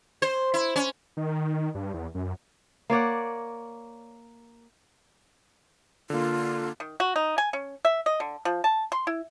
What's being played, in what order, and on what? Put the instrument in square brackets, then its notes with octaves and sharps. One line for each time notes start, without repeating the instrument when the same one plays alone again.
[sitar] C5
E4
C#4
[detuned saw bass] D#3
G2
E2
F#2
[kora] A#3 C#5 D5 F#5
[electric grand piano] D3 A#3 [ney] F4
[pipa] D#3
F#4
D#4
G#5
C#4
E5
D#5
D3
F3
A5
C6
E4